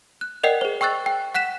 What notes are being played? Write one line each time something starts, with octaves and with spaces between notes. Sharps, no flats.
F#6
A#4 D5 D#5 F#5 G5 C7
G#4 C5
G5 C#6 E6 F#6 A6
G5
F#5 F#6 B6 E7